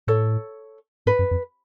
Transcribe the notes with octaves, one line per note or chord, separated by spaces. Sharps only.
A2 A4 C#5
G#2 B4
F#2
F2